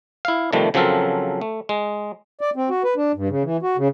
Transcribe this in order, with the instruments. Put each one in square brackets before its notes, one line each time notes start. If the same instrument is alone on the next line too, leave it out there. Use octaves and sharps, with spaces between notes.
[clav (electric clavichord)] E4 F5
C3 D#3 F3 G3 A3
C#3 F3 F#3 C4 A4 A#4
A3
G#3
[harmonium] D5
C4
F#4
B4
D4
G2
C#3
E3
F#4
C#3